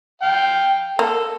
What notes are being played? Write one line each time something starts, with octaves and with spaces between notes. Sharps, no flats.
F5 G5
A#3 A4